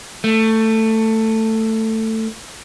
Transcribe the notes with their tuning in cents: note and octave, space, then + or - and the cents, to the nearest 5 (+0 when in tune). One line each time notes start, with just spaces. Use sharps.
A3 +15